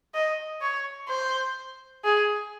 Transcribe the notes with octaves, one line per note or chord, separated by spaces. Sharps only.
D#5
C#5
C5
G#4